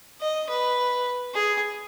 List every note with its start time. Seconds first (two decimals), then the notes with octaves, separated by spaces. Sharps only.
0.21 D#5
0.50 B4
1.34 G#4